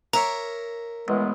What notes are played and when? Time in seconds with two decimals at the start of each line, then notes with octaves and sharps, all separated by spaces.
0.13 A#4 C#5 E5 A#5 D6
1.08 A1 E3 G#3 B3